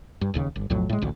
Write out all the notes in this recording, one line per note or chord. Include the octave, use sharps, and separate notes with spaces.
G2
D1 D#2 C#3
G1
B1 F2 A2 F#3
A2 G#3
A1 D2